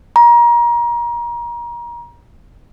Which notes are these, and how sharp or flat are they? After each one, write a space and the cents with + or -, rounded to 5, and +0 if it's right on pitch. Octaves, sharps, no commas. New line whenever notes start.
A#5 +30